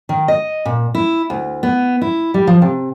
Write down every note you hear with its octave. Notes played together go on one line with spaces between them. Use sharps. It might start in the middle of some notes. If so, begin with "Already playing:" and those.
D#3
D#5
A#2
E4
D2
B3
E4
G3
F3
C3